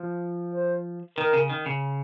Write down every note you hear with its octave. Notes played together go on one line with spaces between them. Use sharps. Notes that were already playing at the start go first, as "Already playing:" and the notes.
Already playing: F3
C5
D#3 A#4
C#3
D#3
C#3